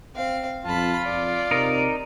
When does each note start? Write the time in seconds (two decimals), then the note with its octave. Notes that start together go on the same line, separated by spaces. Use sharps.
0.15 C4 F5
0.66 F2 F4 A5 B5
1.05 F2 D5
1.51 C3 D#4 A#4